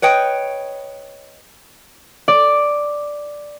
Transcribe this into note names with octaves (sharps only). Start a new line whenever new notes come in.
B4 C#5 D#5 G5
D5